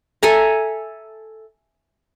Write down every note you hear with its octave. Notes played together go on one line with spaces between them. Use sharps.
A4 E5 G#5 A#5